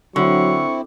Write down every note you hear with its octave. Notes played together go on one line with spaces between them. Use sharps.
D3 F#3 C4 E4 C#6